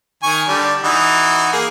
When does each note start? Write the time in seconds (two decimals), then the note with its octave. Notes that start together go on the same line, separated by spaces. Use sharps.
0.23 D#3 G#5 C#6
0.48 D3 G3 D4
0.84 E3 D#4 F#4
1.52 A#3 G#4